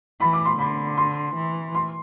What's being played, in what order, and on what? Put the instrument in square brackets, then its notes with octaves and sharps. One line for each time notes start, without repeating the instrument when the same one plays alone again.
[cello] E3 [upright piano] B5
[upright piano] D6
C6
[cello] D3 [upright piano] B5
[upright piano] C6
[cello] E3
[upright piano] C6